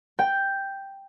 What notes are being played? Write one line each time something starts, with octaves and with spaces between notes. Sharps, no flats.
G5